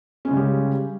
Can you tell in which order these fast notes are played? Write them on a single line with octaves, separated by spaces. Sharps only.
C#4 G#3 C#3 G3 G4